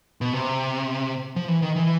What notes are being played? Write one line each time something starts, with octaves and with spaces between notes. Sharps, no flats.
B2
C3
F3
E3
D#3
E3